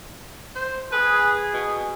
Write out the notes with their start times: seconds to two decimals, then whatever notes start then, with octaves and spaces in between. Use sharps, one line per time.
0.55 C5
0.92 G#4 B4
1.53 B2